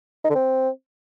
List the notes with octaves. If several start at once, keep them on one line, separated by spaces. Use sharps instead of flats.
D#4
D3
C4